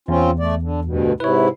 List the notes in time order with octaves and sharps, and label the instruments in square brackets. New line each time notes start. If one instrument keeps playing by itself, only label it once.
[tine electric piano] E2 [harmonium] C4 C#4 F4
[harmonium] A3 D5
D3
D2 G2 B2
[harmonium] G#2 C3 E4 [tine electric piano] B4 C#5